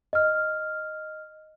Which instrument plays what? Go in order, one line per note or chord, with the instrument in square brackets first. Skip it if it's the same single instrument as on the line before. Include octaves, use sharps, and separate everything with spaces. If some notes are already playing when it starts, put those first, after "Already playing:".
[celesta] D#5 F6